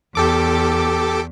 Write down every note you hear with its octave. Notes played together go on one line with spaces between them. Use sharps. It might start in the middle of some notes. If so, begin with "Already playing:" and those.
E2 G4 A4 D6